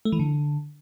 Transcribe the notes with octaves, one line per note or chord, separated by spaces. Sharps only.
A3
E3
D3